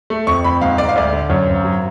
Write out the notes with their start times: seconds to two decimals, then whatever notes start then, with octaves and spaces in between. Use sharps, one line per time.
0.10 A3
0.27 F2 C#6
0.44 F2 B5
0.61 G#2 F5
0.78 G#2 D5
0.89 F5
0.96 D2 D5
1.13 D3
1.30 F#2 C#5
1.47 G#1
1.65 F#3